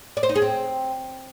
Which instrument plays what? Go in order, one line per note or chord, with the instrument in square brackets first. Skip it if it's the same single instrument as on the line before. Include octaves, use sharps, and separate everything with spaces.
[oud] D5
C5
D#4
G#4
C4